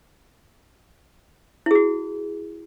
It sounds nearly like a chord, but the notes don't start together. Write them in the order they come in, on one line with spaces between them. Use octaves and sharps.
E4 G#4 F#4